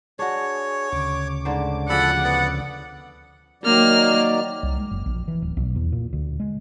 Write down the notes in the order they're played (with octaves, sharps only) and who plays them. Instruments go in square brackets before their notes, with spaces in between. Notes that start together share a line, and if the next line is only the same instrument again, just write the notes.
[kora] D4 F#4 [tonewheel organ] G#4 [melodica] C#5
[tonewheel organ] D2 C#3 D6
[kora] G#2 D3 C5
[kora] F3 F#4 G#4 [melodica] A4 D5 B5 [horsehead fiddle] F#5
[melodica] B3 D5
[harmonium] D#3 F#3 D5 [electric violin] A#3 F6
[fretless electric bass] C2
G#3
F#1
A#1
E3
D1
B1
E2
A#2
D2
G#3